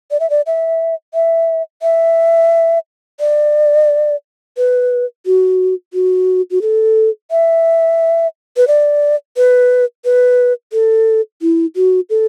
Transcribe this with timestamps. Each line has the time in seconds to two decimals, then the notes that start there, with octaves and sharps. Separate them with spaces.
0.11 D5
0.20 E5
0.30 D5
0.46 E5
1.14 E5
1.82 E5
3.20 D5
4.57 B4
5.26 F#4
5.93 F#4
6.51 F#4
6.62 A4
7.31 E5
8.57 B4
8.68 D5
9.37 B4
10.05 B4
10.73 A4
11.42 E4
11.76 F#4
12.10 A4